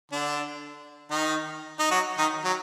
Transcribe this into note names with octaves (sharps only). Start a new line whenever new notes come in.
D3 D4
D#3 D#4
D#4
F#3 F#4
D#3 D#4
F#3